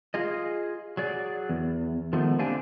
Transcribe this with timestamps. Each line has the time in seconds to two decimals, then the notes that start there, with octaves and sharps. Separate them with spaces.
0.14 F4 G#4 D#5
0.97 F#3 G#4 D5
1.49 E2
2.13 D#3 F3 G#3 A3 B3
2.39 D3 A#3 C4 D4 G4 G#5